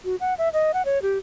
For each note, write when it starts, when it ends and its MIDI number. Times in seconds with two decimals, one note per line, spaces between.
0.05 0.16 66
0.21 0.34 78
0.38 0.49 76
0.53 0.72 75
0.74 0.82 78
0.85 1.01 73
1.02 1.18 67